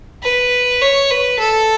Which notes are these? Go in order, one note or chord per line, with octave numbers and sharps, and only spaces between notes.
B4
C#5
B4
A4